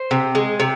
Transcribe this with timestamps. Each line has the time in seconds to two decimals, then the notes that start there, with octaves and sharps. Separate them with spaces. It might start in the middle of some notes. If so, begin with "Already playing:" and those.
Already playing: C5
0.11 C3
0.35 G#3
0.60 C3